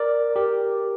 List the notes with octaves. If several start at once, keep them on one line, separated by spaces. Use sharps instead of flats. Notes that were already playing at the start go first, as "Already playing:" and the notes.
Already playing: A#4 D5
G4 A#4